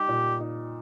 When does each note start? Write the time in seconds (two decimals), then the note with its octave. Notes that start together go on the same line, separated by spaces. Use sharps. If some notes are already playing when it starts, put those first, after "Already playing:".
Already playing: G3 D#4 G4
0.09 A#2
0.40 D#4